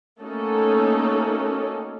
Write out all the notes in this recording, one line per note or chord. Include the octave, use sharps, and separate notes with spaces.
A3 A#3 C#4 D#4 F#4 A4